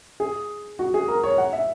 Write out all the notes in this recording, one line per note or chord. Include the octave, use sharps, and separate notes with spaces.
G#4
F#4
G#4
A#4
C#5
F#5
E5